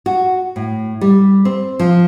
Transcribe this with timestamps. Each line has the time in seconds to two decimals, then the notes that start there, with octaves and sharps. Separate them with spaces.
0.06 F#4
0.56 A2
1.01 G3
1.45 C4
1.80 F3